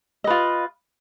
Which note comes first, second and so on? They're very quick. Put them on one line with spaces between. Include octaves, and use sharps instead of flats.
D#5 B4 F4